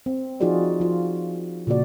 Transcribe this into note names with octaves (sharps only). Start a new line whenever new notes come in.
C4
F3 D#4 F4 F#4 G#4 D5
F3 F4
A#2 C#3 A#3 F#4 D5